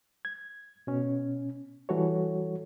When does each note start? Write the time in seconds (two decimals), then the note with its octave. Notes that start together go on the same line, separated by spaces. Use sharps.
0.25 G#6
0.87 B2 C#4
1.89 E3 G3 F#4 A4 C#5